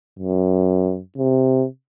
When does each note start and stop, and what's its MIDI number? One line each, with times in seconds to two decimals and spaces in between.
0.19 1.00 42
1.18 1.66 48